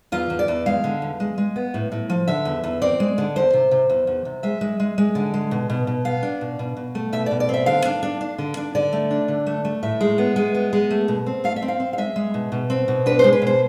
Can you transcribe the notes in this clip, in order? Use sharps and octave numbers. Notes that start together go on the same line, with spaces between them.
E2 F4
E2
D5
E2
G#3 F5
D3
E2
G#3
G#3
B3
A2
A2
F3
D3 E5
E2
E2
C4 D5
G#3
D3
E2 C5
C3
C3
E2
E2
C3
G#3 E5
G#3
G#3
G#3
D3
G#3
B2
B2
B2
B3 F5
D4
B2
B2
B2
A3
B2 E5
B2 D5
D5
C4 E5
D3 F5
D4
D4
D4
D3
D4
D3 D5
A3
D4
D3
A3
A3
A2 E5
G#3
B3
G#3
B3
G#3
A3
B2
C4
A3 F5
E5
C4
F5
C4
F5
G#3 E5
G#3
B2
B2
C4
B2
D4 B4
G#3 C5
B4
B2 C5